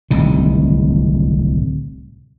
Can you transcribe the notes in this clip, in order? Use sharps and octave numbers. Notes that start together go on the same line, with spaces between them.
D1 C2 D#3